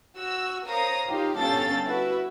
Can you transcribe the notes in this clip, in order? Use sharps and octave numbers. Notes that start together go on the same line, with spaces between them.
F#4 E6
A#4 C5 C#5 F5 A#5 D#6
D#4 F4 G4 F5
G1 C#4 A4 F5 G5 A6
E4 F#4 B4 E5